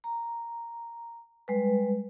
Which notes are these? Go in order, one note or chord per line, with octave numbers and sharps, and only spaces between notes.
A#5
G3 G#3 B4